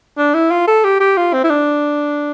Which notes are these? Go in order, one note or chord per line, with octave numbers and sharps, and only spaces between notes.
D4
E4
F4
A4
G4
G4
F4
C4
E4
D4